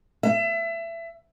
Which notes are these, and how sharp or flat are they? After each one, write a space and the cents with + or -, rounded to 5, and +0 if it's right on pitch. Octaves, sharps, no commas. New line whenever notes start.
E5 +25